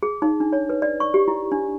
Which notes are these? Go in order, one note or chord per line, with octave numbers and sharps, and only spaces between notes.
G#4
D#4
D4
C#5
B4
D5
C#6
G4
E4
D4